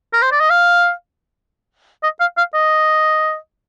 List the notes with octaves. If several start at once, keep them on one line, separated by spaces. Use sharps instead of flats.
A#4
C5
D5
D#5
F5
D#5
F5
F5
D#5